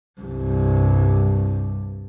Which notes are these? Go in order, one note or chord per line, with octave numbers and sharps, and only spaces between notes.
C2 G2